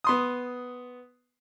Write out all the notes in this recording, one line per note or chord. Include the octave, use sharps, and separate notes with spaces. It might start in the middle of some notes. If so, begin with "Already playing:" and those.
B3 C6 D#6